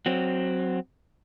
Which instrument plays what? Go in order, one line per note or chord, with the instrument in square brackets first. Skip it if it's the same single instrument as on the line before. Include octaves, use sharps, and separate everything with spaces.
[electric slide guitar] F#3 C4